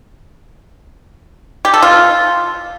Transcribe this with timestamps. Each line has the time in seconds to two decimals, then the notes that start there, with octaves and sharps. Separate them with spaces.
1.65 G4
1.74 A4
1.82 F4